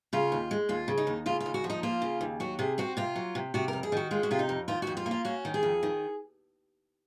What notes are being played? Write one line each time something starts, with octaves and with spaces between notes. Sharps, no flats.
C#3 F4
D#2
G#3
D#2 F4
C#3
D#4
D#2
C#3 F4
F4
D#2
F#4
F3
D#4
A#3 F4
C#3
D#2
F#3 F#4
C3 G#4
C4 F#4
C3 F4
F#3
C3
C3 F#4
A#4
F2
G#4
D#3 F#4
G#3 F4
F#4
C3 F4
D#4
F2
D#3 F4
F2 F#4
F4
A#3
F4
C#4 F#4
D#3
G#4
F2
D#3